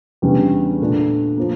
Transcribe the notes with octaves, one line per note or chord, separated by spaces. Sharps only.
E2 C#3 G3 D4
A#2 A3 D4
F3 A#3